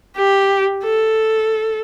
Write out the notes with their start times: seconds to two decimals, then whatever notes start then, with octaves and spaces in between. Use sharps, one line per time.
0.17 G4
0.84 A4